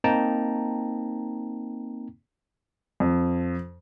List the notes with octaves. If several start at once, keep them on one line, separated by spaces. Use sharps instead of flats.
A#3 C4 D#4 G5 A5 A#5
F2